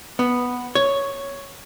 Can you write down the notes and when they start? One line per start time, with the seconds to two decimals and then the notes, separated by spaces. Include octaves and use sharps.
0.19 B3
0.75 C#5